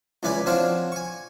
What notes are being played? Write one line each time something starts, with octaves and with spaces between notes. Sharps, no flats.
C#2 E3 C#4 B4 D5 G#5
F3 C4 D4 F#4 C#5 F5
G#5 C#6